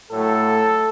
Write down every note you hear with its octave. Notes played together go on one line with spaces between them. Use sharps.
A2 F#3 A3 A4